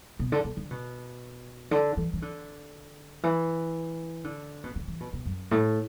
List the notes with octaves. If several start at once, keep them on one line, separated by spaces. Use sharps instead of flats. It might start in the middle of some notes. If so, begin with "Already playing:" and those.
B2
D3
B2
D3
B2
D3
E3
E3
D3
E3
D3
B2
D3
E3
B2
B2
F#2
A2